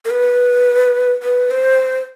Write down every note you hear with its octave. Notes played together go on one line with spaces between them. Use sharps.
A#4
B4
B4
C5